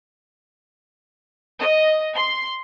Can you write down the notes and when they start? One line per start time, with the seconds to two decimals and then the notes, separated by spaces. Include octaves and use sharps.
1.60 D#5
2.15 C6